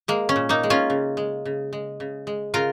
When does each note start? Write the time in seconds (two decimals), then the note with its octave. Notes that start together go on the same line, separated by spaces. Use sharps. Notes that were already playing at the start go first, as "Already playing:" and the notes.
0.08 G#3 A#3
0.29 C#4
0.36 A#2
0.49 A#3 D#4
0.63 G#3
0.70 C#4 F4
0.90 C#3
1.17 G#3
1.45 C#3
1.73 G#3
2.00 C#3
2.27 G#3
2.54 C#3 F4 A#4